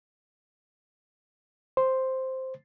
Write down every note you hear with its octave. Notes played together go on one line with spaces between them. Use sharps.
C5